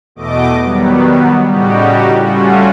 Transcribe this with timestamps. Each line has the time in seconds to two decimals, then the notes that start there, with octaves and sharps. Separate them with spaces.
0.15 E2 B2 A3 D#5 D6
0.61 D#3 F#3 G3 B3
1.45 A2 C#3 G3 D#4 F#4 G4
2.21 G3 A3 C#4 F4 F#4